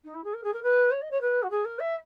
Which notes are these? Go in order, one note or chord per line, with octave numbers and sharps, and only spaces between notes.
D#4
E4
G#4
A#4
G#4
A#4
B4
C#5
D#5
C#5
B4
F#4
G#4
A#4
E5